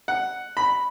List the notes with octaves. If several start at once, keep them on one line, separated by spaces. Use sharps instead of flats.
F#5
B5